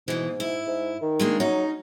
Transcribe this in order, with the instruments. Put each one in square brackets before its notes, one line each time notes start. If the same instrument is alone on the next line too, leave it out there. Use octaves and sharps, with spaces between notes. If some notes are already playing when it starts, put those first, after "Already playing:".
[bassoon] G#2 [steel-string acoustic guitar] B2 E3
[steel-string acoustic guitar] E4
[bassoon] G#2
D#3
[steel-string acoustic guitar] G#3 A#3 D4
[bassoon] F#3 [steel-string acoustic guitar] C#4 D#4